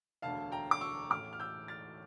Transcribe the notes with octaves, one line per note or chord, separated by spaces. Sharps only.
E1 D2 D3 F5 A5
G5 A#5
D6
C#6 E6
A1 A2 E3 D6 F6
F6
E6 G6
F6 A6